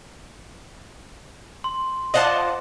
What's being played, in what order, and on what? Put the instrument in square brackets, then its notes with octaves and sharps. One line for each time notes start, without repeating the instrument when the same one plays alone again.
[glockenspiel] C6
[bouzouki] F4 C5 D5 [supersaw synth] D#5 F#5 A5